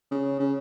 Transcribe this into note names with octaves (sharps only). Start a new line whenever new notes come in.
C#3
C#3